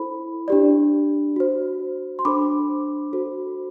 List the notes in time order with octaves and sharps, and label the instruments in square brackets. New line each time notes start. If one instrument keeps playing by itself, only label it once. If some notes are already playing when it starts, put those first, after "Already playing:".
Already playing: [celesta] E4 A4 C5 B5
D4 G4 D5
F#4 C5
C6
D4 A4 C5 B5 D6
F#4 A4 C5